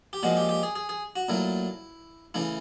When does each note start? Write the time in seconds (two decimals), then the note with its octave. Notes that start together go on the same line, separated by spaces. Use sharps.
0.13 G4
0.23 A#2 F3 G#3 F#4
0.37 G4
0.49 G4
0.63 G#4
0.76 G#4
0.89 G#4
1.16 F#4
1.29 A#2 F#3 A3 E4
2.34 C#3 E3 A3 E4